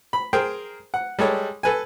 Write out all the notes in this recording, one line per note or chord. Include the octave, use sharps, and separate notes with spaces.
B5
G#4 A#4 C5 G5
F#5
G3 G#3 A4 C#5
A4 B4 G#5